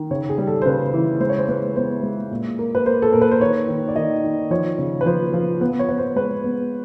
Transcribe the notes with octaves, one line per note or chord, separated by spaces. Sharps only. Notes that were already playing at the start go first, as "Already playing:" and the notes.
Already playing: D#3
C#3 C#5
G#4
G3
A4
C5
C#3 B4
E3
G#3 C5
C#5
C5
G#3 B4
B3 C5
G#3
A#2
A#3
B4
A#3 C5
A4
A#2 A#4
B4
C5
D#3 C#5
D#3
D5
D#3 D#5
D#3
F3 C#5
C#3
B4
F3 C5
F3
B3 B4
C#5
B3 B4
C5
G#3 B4
B3